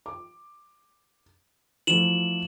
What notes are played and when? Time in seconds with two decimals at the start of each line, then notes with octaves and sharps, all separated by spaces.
0.06 D6
1.87 E3 F3 A3 E7 F#7